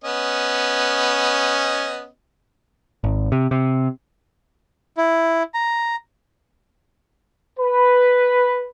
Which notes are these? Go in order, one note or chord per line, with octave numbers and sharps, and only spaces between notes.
B3 C#4 D#5
G#1
C3
C3
E4
A#5
B4